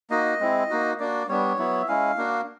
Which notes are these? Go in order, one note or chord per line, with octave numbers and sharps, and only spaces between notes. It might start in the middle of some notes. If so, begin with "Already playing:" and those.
A#3 D#4 F#4 D#5
G#3 C4 E4
A#3 D#4 F#4
A#3 D4 F#4 D5
G3 B3 D4 C#5
F#3 B3 E4
E5
G#3 C#4 E4 F5
A#3 D4 F#4